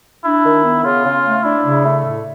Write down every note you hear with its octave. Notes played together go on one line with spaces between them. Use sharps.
D4 E4
D#3
B3
C#3 F4
C#3
A3
D4 E4
C#3
A3
A2